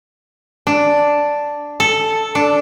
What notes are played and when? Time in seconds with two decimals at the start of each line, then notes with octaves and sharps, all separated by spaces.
0.67 D4
1.80 A4
2.35 D4